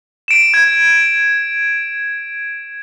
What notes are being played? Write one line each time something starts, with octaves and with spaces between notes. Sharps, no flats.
D7 E7
G#6